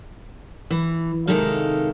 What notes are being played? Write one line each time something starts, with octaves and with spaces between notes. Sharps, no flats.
E3
C3 D#3 G#3 D#4 A4 F5